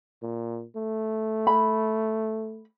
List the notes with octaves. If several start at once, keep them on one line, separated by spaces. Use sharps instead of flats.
A#2
A3
B5